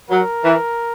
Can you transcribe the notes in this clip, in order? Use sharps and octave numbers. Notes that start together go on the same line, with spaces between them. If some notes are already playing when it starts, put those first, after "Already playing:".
F#3 A#4
E3